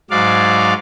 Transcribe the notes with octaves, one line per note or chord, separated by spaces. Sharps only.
G#2 F#3 D5 F5